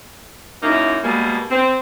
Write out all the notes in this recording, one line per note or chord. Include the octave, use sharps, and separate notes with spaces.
F#2 A#3 D#4 E4
B2 G3 G#3 A#3
C4